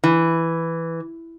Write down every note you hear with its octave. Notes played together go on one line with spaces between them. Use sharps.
E3